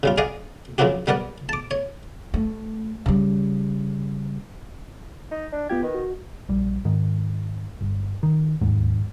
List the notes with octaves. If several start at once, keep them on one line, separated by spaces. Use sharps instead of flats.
C#3 G3 F4
G#4 D5 D#5 F5 F#5
C#3 F3 A#3 C4 F#4 G4
G3 B3 A#4 D5 F#5
A5 D6
C#5
A3
C#3 G3
D#4
D4
B3 F4 G4 G#6
D#3 B4
F#4
A#1 G3
G#2 D#3
G1
D#3
D1 D#2 G#2